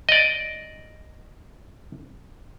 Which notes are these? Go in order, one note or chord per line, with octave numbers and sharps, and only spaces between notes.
D5 D#5